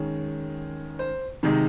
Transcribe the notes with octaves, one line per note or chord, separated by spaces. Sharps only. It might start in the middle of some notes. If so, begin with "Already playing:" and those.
Already playing: D#3 G#3 C#4
C5
C3 D#3 G#3 D#4